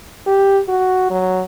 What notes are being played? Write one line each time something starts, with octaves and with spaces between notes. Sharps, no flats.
G4
F#4
F#3